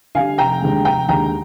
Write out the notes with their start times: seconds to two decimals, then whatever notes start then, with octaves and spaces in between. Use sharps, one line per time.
0.15 D3 G3 F5 G#5
0.38 F1 G5 A#5
0.62 D#2 D3 G#3
0.85 F1 G5 A#5
1.09 D#2 D3 G#3 G5 A#5